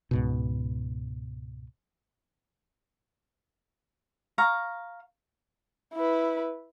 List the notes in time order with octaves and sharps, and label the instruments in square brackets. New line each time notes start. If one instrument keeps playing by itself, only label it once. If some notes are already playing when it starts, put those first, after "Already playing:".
[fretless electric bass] C#2 G#2 B2
[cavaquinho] F5 A#5 C#6
[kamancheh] E4 B4